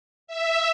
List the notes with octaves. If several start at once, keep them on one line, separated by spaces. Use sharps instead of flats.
E5